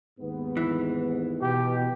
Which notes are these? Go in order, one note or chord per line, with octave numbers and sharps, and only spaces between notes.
D#2 G#2 B3
E3
B2 G4